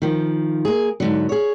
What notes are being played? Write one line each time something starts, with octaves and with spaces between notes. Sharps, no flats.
D#3 F3
A#3 G#4
G#2 D3 F#3
G#4 C#5